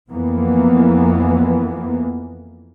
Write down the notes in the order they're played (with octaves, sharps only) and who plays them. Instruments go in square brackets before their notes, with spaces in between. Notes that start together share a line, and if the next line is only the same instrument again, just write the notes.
[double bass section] F2 E3 A#3 B3